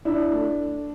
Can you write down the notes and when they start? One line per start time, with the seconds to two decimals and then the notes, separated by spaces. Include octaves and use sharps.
0.05 D4 E4
0.32 A3